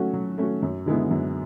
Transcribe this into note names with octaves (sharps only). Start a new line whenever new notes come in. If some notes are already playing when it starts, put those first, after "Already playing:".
Already playing: F#3 A3 C#4 F#4
F#3
A3 C#4 F#4
F#2
D3 G#3 B3 E4
F#2